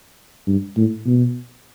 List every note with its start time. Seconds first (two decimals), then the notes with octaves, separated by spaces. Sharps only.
0.47 G2
0.77 A2
1.06 B2